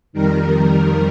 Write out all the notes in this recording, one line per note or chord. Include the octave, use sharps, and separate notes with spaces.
F2 D#3 G3 A#4